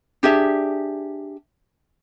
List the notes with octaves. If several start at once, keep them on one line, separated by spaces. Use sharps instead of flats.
D4 G4 G#4 E5